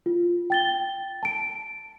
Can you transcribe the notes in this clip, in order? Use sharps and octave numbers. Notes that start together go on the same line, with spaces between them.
F4
G5 A6 G7
A5 D7